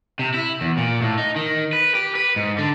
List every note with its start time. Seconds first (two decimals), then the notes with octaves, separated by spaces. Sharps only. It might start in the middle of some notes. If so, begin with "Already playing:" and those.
0.19 C3
0.34 E4
0.61 E2
0.77 A#2
1.02 A2
1.18 D#4
1.36 D#3
1.73 B4
1.95 G4
2.15 B4
2.36 G#2
2.58 D3